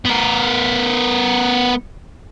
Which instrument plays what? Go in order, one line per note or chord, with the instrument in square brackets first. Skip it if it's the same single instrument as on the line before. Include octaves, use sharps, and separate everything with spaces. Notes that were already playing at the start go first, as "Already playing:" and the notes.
[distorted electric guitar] B3 A#4